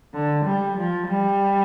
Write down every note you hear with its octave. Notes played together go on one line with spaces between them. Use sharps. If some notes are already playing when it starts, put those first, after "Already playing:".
D3
G3
F3
G3